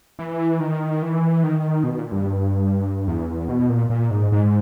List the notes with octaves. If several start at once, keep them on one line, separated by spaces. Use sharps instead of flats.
E3
D#3
E3
D#3
B2
A#2
G2
E2
B2
A#2
A#2
G#2
G#2